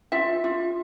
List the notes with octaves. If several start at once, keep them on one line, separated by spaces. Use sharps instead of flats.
F4 E5
F4